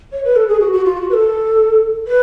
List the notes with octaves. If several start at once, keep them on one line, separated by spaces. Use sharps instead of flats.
C#5
B4
A4
G#4
F#4
F#4
F4
F#4
B4
A4
B4